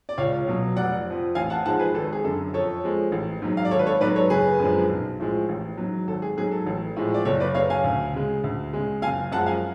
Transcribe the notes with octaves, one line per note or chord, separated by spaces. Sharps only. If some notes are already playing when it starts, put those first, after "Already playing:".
D5
C#2 C#5 F5
B2 F#3
F1 D5 F#5
F2 F3
A1 F5 G#5
F#5 A5
G#2 F3 G#3 F#5 A5
G#4 B4
G#1 A4
G#4
F#2 D3 A4
F2 A4 C#5
F3 G#3
A1
G#2 F#3
F5
D5
G#1 A4 C#5
B4
A4 C#5
G#2 F#3 B4 D5
A4 C#5
F#1 G#4 B4
F#2 D3 F3 G#3
B1
A2 F3 G#3
A1
G#2 F#3
G#1 A4
G#4
G#2 F#3 G#4
A4
A1
A2 F3 G#3
D5
F#1 A4 C#5
B4 D5
F#2 C#3 C#5 F5
F5 G#5
D2
C#3 G#3
D2
C#3 G#3
F#1 F5 G#5
F#2 F3 G#3 F#5 A5
F5 G#5